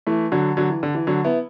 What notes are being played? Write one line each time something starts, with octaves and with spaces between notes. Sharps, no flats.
E3 A3
D3 F#3
D3 F#3
E3
D3
E3
D3 F#3
B3 E4